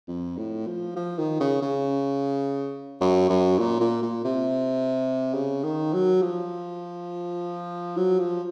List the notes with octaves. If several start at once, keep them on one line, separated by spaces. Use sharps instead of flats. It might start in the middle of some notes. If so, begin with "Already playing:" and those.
F2
A2
F3
F3
D#3
C#3
C#3
F#2
F#2
A#2
A#2
A#2
C3
C#3
D#3
F#3
F3
F#3
F3